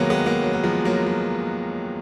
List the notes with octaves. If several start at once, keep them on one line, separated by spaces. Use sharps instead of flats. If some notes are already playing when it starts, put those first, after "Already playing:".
Already playing: F1 D#2 D#3 F#3 G#3 A#3 B3
G#3 B3
F#3 A#3
F#3
A#3
F3 G#3
F#3 A#3
F#3